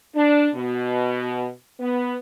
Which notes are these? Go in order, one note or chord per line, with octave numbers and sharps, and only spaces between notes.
D4
B2
B3